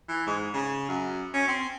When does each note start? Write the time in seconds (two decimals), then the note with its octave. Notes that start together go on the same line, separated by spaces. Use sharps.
0.09 E3
0.27 G#2
0.54 C#3
0.88 F#2
1.33 C#4
1.48 C4